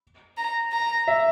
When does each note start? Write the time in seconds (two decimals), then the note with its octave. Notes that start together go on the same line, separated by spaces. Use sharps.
0.37 A#5
0.72 A#5
1.08 E5